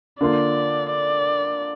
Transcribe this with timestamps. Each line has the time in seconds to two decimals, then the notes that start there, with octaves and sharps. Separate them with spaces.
0.21 D3 A#3 F4 D5
0.90 D5